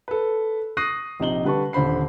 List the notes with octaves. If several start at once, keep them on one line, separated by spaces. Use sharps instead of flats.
A4 B4
C#6 D#6 F#6 A#6 C7 D#7
A#1 C3 D#4 F#7 G7
D3 G3 B4 A5 C#6
D#1 D3 C5 B5 C7